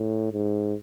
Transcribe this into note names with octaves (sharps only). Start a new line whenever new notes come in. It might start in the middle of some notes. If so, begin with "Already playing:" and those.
Already playing: A2
G#2